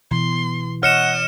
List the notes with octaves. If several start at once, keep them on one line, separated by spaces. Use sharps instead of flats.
B2 E3 C6
C#5 D#5 F#5 F6 C#7 E7